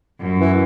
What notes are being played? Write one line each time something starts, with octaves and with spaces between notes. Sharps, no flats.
F#2
E3